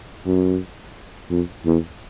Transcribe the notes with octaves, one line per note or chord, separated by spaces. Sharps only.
F#2
F2
E2